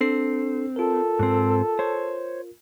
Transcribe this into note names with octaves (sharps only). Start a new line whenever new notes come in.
C4 D4 A4 C7
F4 A4 A#4
G#2 C4
C5 C#5